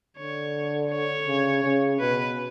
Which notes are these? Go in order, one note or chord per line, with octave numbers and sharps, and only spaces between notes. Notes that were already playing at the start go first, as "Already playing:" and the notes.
D3 C#5
C#5
C#3
C#3
B2 B4